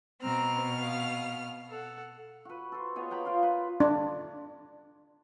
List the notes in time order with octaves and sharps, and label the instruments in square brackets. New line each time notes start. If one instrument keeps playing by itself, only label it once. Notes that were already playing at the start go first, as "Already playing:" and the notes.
[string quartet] B2 F6 [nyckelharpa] C4 A#5
[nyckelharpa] F5 D#6
A4 F#5
[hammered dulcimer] F#4 B4
A4 C5
B3 G#4 C#5 D#5
F#5 G5 A#5 B5
F4 A#4 F5 C6
B4
[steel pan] D4